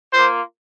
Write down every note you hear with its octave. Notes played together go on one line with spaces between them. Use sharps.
A#3 F4 C5